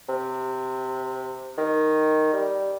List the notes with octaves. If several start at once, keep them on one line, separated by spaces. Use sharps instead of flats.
C3
D#3
G3